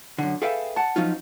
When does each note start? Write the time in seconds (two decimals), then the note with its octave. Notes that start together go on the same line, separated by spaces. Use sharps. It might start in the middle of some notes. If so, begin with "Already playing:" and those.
0.18 F#2 D3
0.42 G#4 A4 B4 E5 F5 G5
0.76 F#5 A5
0.96 F3 F#3 C#4 D#4 F4